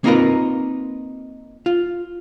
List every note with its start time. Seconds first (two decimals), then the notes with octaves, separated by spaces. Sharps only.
0.04 A#3 C4 D#4 F4 A#4 B4
1.66 F4